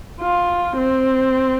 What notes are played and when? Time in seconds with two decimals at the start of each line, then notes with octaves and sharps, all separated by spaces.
0.21 F4
0.77 C4